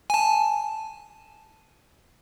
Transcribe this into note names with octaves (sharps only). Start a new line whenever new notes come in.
G#5 A5